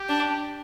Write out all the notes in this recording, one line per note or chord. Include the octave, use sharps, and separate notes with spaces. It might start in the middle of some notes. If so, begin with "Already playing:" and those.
Already playing: G4
D4